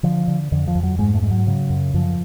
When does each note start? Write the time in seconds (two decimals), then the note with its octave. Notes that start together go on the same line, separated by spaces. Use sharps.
0.03 D3 F3
0.28 D3
0.52 F2 D3
0.67 F3
0.75 F2
0.83 F#3
0.99 G#2 G#3
1.14 A3
1.22 G#2 G#3
1.31 F#3
1.47 C#3
1.70 F#2
1.94 F#2 F3